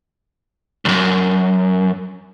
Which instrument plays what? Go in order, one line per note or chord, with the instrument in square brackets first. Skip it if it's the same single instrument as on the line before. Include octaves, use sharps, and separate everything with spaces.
[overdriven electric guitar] C2 F#2